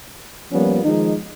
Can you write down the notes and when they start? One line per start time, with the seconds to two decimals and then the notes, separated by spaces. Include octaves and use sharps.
0.52 F3 G3 A#3 B3 C#4 F4
0.84 D#3 F3 G#3 D#4